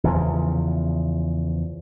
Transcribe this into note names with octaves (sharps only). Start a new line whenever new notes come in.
E2 C#3 F3